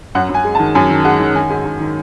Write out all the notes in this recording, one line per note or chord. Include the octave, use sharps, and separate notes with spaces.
F#2 F#5
F#2
G#5
G#3
A5
D#3
F#2 G#5
D#3
G#3 F#5
D#3
D#3 G#5
G#2
G#2
D#3